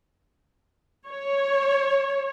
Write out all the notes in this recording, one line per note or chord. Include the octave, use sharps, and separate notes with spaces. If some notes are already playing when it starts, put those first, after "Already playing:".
C#5